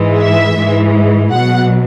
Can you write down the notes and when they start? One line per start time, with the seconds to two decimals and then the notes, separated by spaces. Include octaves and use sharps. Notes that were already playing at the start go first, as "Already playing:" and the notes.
Already playing: G#2 E3 G#3
0.18 E5
0.55 G#2 E3 G#3
1.31 B2 F#3 F#5